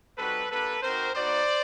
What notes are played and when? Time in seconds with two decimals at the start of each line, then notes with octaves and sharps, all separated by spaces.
0.17 G3 C4 D#4 F#4 A4 B4
0.50 A#3 D4 G4 A4 B4
0.83 C4 D#4 F#4 A#4 C5
1.15 B3 D#4 F#4 C5 D5